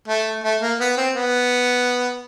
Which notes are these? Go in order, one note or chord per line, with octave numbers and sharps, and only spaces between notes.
A3
A3
A#3
B3
C4
B3